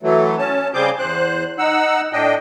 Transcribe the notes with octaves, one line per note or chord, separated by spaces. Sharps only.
E3 F#3 A3
C#4 A5
C#3 G3 C4 G#4 D6 G6
E2 C5 F#6
D#4 F#5 E6
A2 D4 D#5 G5